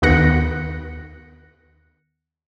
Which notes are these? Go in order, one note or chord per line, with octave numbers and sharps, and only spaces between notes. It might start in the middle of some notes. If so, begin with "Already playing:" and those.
D#2 D#3 B3 F#6 A#6 C#7